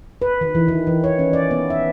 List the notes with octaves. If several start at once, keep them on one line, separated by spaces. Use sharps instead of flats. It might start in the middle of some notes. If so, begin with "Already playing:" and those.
B4
D#3
E3
D#3
E3
C#5
C#4
D5
B3
E5